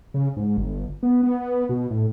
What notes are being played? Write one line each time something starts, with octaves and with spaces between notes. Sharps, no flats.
C#3
G#2
G1
B3
B3
B2
A2